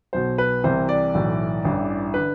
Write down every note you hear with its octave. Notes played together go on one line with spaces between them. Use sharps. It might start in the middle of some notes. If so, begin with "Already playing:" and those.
B1 B2 C5
B4
C2 C3 E3 C5
D5
B1 A2 E3
A1 G2 E3
D3 B4